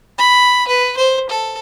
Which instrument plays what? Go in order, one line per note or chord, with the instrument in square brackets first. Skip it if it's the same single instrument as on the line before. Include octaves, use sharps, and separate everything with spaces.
[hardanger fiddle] B5
B4
C5
A4